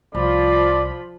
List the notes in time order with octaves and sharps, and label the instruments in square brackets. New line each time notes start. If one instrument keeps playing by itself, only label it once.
[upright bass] C2 [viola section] F3 F4 B5 [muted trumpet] D5